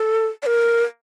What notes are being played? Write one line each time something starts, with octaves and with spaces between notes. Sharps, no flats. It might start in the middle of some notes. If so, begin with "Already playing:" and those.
Already playing: A4
D5
A#4